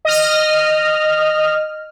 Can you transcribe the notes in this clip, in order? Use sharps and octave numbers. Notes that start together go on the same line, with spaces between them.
D#5 F6